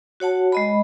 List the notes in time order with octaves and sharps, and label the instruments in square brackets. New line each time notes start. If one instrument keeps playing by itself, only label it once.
[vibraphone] F#4 C#5 F#5 A5
G#3 D#5 B5